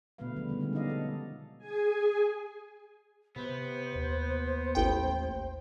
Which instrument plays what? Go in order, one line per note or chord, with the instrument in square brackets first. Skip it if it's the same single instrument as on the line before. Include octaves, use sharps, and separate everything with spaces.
[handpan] B2 D3 A3 B3 B4 F5
C#3 F3 G3
D3 D#3 B3
D3 G3 G#3 C4 C#4
B3 C#4 D#4 D5 D#5 F5
G4 A4
[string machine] G#4 G#5
[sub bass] C3 [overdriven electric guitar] B3 [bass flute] C5
[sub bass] D#2
[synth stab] A1 G5